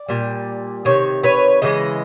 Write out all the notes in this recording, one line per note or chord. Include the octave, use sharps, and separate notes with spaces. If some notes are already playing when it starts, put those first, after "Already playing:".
Already playing: D5
A#2 G3
C3 D#3 C#5
B4 C#5
C#3 E3 G#3 D#5